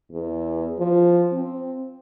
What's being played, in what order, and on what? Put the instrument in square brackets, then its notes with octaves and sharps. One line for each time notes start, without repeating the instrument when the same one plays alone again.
[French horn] E2
F3
C4